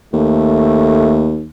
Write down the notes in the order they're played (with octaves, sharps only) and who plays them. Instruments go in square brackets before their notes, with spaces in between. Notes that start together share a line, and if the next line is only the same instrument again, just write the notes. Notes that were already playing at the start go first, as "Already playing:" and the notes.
[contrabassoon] D#2 [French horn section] A3